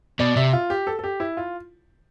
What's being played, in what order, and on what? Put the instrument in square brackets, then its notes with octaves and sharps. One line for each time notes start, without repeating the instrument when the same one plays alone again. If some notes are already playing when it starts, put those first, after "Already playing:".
[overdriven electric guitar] B2 [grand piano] D5
[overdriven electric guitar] C3 [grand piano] E5
[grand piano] F4
G4
A4
A4
G4
E4
F4